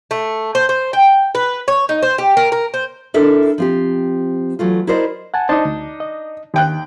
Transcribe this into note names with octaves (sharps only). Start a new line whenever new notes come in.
A3
C5
C5
G5
B4
C#5
D#4
C5
G4
A#4
A#4
C5
D4 E4 A4 A#4 E5
F3 C4 G4
E3 F#3 A3 F4
E4 F#4 A#4 C5 D5 D#5
F#5 G#5 A5
D4 D#4 C5 D#5 A5
D2
D#5
D#2 D#3 G5 F#6